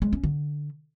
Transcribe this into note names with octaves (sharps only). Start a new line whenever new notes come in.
G#3
C#4
D3